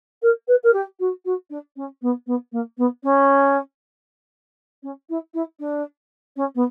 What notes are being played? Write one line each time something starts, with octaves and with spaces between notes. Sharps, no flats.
A#4
B4
A#4
G4
F#4
F#4
D4
C#4
B3
B3
A#3
B3
C#4
C#4
E4
E4
D4
C#4
B3